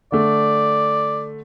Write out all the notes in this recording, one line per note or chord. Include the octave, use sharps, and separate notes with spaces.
D3 A3 D5